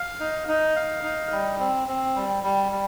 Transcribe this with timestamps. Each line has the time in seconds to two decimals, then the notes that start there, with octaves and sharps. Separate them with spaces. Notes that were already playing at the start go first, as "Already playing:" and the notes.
Already playing: F5
0.20 D#4
0.48 D#4
0.76 F5
1.03 D#4
1.32 G3
1.60 C4
1.88 C4
2.16 G3
2.44 G3
2.72 G3